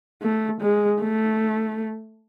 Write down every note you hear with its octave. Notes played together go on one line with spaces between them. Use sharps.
A3
G#3
A3